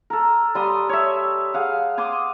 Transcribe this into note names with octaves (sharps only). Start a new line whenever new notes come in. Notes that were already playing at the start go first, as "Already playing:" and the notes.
A4 A#4
G3 C6 D#6
C#5 E5
G#4 F5 F#5
G#5 C6 D6 D#6